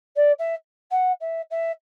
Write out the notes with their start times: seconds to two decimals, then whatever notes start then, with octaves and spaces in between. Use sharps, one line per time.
0.16 D5
0.39 E5
0.91 F#5
1.21 E5
1.50 E5